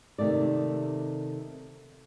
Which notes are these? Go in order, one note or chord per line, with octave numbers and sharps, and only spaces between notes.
C3 D#3 A3 D5